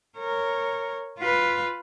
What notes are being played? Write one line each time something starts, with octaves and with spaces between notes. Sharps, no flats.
A#4 C#5
F4 B4